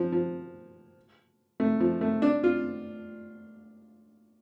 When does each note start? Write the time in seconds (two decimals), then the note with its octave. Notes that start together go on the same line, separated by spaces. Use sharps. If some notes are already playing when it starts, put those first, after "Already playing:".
Already playing: F3
0.12 F3
1.60 A3
1.80 F3
2.01 A3
2.22 D4
2.44 F4